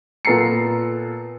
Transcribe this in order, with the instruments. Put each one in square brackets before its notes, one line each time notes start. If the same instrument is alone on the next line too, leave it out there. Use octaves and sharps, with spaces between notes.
[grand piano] A#2 B3 A4 A#5 C7 C#7